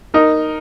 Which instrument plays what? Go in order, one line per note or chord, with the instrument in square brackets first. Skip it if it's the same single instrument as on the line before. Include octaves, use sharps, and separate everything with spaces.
[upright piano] D#4 [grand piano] A#4